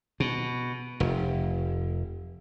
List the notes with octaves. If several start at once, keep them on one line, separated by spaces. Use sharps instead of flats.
B2
F1